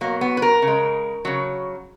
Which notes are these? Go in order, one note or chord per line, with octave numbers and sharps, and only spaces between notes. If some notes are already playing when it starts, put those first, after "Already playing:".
B2 F#3 A#3
B3
B4
A#4
C#3
G#3
C#3 F#3